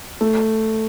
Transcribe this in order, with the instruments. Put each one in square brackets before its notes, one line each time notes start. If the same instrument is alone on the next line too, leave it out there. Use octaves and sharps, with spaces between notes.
[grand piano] A3